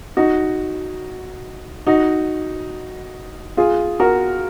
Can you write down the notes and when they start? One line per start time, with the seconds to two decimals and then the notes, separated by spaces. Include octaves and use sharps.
0.17 D#4 F#4
1.87 D#4 F#4
3.57 F4 G#4
4.00 F#4 A#4